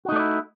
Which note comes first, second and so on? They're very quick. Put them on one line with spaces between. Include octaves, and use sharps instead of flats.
F#4 D#4 A3 D5 E4